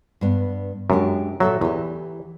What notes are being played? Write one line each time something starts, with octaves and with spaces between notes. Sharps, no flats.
G2 B3
F#2 G#3 D4 G4
A#2 F#3 A4 E5
E2 E3 G4